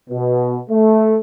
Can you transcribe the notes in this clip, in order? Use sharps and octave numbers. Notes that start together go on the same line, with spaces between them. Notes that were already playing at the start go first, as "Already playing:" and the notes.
B2
A3